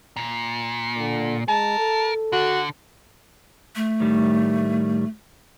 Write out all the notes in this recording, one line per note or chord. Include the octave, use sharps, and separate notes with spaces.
A#2
D3
G#3 A#4 A5
A4
D3 F#4
A3
A2 D#3 G3